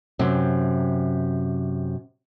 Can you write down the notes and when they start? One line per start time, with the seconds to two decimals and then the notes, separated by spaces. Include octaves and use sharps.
0.19 F#2 C3 C4